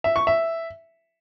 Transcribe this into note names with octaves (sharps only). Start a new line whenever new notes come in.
E5
C#6
E5